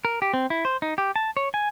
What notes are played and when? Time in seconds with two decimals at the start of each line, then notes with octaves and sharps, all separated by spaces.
0.05 A#4
0.22 G4
0.34 C4
0.50 E4
0.65 C5
0.82 D#4
0.98 G4
1.16 A5
1.37 C#5
1.54 G#5